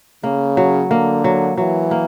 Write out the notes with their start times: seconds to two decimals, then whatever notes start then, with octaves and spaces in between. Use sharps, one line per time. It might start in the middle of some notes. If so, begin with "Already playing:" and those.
0.24 C#3 A#3
0.57 F#3
0.91 D3 A#3
1.24 F#3
1.57 E3 F#3
1.91 A#3